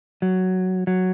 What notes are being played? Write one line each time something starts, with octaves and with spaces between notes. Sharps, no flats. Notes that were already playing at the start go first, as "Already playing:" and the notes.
F#3
F#3